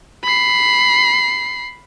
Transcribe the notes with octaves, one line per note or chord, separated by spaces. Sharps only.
B5 C7